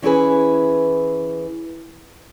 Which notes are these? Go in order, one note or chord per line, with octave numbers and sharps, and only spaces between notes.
E3 C#4 E4 G#4 B4